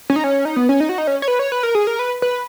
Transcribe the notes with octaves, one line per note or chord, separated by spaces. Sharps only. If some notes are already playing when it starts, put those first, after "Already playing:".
C#4
D#4
C#4
D#4
B3
C#4
D#4
F#4
D#4
C#4
C#5
B4
C#5
B4
A#4
G#4
A#4
B4
B4